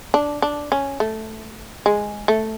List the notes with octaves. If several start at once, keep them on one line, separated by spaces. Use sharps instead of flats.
D4
D4
C#4
A3
G#3
A3